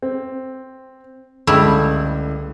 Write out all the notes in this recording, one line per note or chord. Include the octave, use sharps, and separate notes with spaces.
C4
C#2 D3 G3 A3 E4